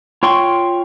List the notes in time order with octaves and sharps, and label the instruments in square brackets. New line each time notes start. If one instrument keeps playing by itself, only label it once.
[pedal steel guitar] F4 C#5 G5 C6 C#6